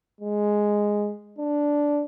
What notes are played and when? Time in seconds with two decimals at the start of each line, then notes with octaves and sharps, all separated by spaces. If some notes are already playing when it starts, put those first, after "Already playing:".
0.21 G#3
1.38 D4